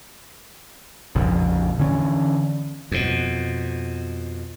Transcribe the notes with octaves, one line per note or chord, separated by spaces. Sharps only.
A#1 F2 C#3
D3 E3 C#4
F2 B2